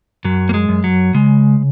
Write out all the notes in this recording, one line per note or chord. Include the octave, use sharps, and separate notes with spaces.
F#2 F#3
A#3
G#3
F#2
F#3
C#3 G#3